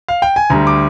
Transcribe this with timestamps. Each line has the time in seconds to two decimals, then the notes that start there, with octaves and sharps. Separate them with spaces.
0.08 F5
0.22 G5
0.36 G#5
0.50 D2 D3 G3 A#5
0.67 D6